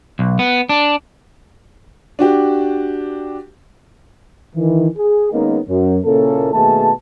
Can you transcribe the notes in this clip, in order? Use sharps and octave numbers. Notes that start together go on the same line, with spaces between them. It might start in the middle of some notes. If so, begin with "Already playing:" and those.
B1
B3
D4
D4 F#4 G4
D#3 E3
G#4
D#3 G#3 A#3 B3 C#4 D#4
F#2
A#2 C#3 A#3 C#4 E4 A4
B2 D#3 A3 A#3 G#4 A5